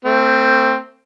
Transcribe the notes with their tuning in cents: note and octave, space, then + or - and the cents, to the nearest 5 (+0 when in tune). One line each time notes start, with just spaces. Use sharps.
A3 +40 C4 +0